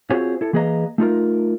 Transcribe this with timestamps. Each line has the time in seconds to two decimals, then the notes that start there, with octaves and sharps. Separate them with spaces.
0.10 C4 F4 F#4 G#4 C5 C#5
0.41 E4 A4
0.53 E3 A#3 G#4 B4 D#5 A#5
0.98 A3 D#4 F4 A#4